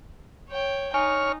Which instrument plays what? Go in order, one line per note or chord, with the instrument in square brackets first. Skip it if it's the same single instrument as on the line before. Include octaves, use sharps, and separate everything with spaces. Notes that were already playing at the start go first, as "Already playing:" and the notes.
[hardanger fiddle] C#5 G5
[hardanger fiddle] D#4 [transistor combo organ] C#5 F6 [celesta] G#5